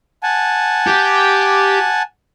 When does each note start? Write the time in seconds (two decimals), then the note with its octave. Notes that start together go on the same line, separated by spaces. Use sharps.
0.23 F#5 G#5 A5
0.87 G4